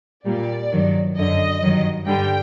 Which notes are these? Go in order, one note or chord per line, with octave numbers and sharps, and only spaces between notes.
A#2 G3 D5
G2 D#3 F#3
F#2 D3 F#3 D#5
G2 D#3 F#3
G2 D3 G3 G5